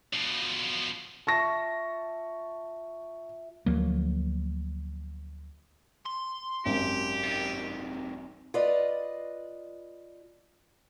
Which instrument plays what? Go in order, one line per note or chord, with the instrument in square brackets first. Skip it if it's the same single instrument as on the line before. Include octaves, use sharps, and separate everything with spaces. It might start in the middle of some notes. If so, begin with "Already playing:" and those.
[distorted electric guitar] B2 F3
[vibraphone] F4 E5 [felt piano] A5 C#6 A#6
[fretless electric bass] D2 F3 F#3 A#3
[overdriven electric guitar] C6
[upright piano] G#1 F#2 [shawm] G4
[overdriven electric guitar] C3 D#3
[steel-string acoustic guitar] F4 B4 D5 D#5